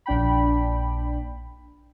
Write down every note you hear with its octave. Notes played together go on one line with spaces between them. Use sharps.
A#1 D4 G5 B5